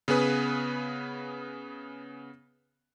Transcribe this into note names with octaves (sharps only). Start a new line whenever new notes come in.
C#3 B3 G#4 B4 D#6